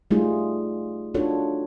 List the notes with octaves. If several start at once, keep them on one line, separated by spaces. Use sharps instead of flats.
G3 A3 D#4 F4 G#4
D4 D#4 F4 F#4 A4 C#5